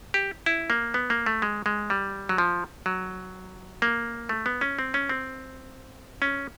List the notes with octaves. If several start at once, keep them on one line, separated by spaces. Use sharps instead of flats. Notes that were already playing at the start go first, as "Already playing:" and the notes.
G4
E4
A#3
B3
A#3
A3
G#3
G#3
G3
F#3
F3
F#3
A#3
A3
B3
C#4
C4
C#4
C4
C#4